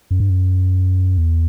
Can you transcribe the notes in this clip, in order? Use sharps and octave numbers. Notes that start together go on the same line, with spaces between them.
F#2
G2
F#2
E2